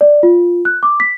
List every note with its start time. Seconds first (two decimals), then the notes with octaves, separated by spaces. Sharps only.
0.01 D5
0.23 F4
0.65 F#6
0.83 D6
1.00 B6